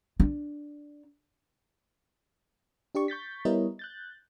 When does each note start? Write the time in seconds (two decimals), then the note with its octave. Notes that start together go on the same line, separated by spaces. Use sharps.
0.20 D4
2.95 D4 G4 D5 C#6
3.08 C#6 G6 A6 B6
3.45 G3 B3 E4 A#4 C#5 D#5
3.79 F#6 G6 A6